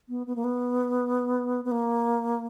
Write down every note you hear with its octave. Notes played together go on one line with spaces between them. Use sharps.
B3
B3
A#3
B3
B3
A#3